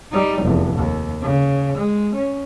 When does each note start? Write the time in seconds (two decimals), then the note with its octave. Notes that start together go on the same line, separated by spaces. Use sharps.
0.12 G3 D#4
0.42 F1 E2
0.76 D#2
1.22 C#3
1.77 G#3
2.14 C#4